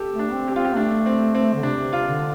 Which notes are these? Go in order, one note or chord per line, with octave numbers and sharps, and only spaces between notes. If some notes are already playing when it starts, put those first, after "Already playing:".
Already playing: G4 A4
A3
D4
C4
G4
C4 F4
G4
A3 D4
C4
C4
D3
C3 D4
F4
D3